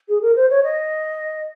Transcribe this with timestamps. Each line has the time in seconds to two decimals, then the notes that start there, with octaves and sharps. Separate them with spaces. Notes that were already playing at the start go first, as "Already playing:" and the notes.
0.08 G#4
0.21 A#4
0.36 C5
0.50 C#5
0.63 D#5